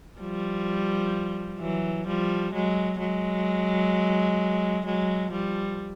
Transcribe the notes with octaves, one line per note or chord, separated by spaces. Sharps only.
F3 G3
E3 F#3
F3 G3
F#3 G#3
F#3 G#3
F#3 G#3
F3 G3